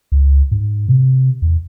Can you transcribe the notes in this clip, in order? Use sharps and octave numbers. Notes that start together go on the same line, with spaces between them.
C#2
G#2
C3
E2